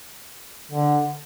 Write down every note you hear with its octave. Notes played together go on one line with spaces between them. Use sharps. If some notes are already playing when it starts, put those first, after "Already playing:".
D3